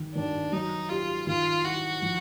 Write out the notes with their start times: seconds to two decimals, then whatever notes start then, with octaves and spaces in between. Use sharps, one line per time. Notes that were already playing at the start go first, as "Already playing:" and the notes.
Already playing: D#3
0.15 D#3 D4
0.52 F#3 D#4
0.89 F4 G4
1.27 D#3 F4
1.64 E4 F#4
2.02 F3